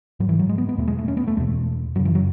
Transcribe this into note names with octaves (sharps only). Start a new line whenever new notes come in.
G#2 F#3
E3
F#3
G#3
B3
B3
E2 B2 A3
G#3
A3
C#4
B3
A3
E2 B2 G#3
F#2 C#3 F#3
E3
F#3